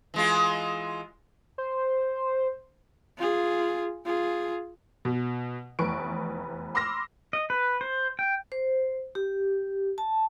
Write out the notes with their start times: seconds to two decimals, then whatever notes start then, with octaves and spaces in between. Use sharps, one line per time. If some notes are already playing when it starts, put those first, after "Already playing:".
0.14 E3 G#3 F4
1.58 C5
3.18 F4 G#4
4.06 F4 G#4
5.05 B2
5.79 F1 E2 B4 C#6 D7
6.75 B5 C6 D6 E6 F6 A#6
7.33 D#5
7.50 B4
7.81 C5
8.19 G5
8.52 C5
9.15 G4
9.98 A5